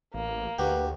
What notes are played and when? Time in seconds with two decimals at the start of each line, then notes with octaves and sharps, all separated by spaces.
0.14 A1 A#3
0.58 D2 F#4 G4 B4